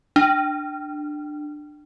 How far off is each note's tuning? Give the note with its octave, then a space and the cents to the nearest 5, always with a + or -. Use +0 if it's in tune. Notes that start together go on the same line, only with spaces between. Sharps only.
D4 +20